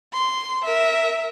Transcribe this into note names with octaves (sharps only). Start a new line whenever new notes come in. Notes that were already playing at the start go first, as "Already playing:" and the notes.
C6
A#4 E5